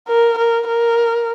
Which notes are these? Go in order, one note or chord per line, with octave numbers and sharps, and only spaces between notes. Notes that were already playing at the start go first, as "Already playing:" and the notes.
A#4
A#4
A#4